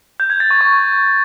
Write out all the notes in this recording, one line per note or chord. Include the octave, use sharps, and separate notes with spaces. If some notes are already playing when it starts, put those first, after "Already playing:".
G6
G#6
A6
C#6
C#6